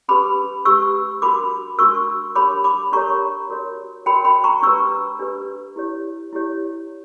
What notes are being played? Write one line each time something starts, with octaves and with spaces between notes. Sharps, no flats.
C#4 G4 B4 B5 D6
C#4 G4 B4 C#6 E6
D4 F#4 A#4 B5 D6
D4 F#4 A#4 C#6 E6
D4 G4 A#4 C#5 B5 D6
B5 D6
D4 G4 A#4 C#5 A#5 C#6
F#4 A#4 C#5
F#4 A#4 C#5 G5 B5
G5 B5
A#5 C#6
D4 G4 B4 C#6 E6
D4 G4 B4
E4 G4 C#5
E4 G4 C#5